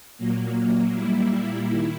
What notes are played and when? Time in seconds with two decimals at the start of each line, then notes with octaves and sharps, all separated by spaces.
0.18 A#2 F#3 A#3
0.93 A#2 G3 A#3 E4
1.69 D#3